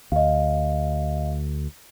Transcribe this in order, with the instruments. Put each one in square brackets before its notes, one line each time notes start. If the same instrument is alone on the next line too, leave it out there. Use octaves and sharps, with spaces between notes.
[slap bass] D2 [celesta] D#5 F5